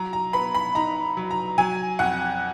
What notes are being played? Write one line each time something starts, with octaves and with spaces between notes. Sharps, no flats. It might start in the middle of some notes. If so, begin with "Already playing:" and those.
Already playing: F#3 A#5
A#5
B3 B5
B5
D#4 A#5
F#3
A#5
F#3 G#5
F2 F#5